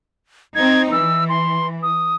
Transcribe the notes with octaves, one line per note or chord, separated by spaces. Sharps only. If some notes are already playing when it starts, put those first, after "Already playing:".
C4 D#4 G#6
E3 E6
C6
D#6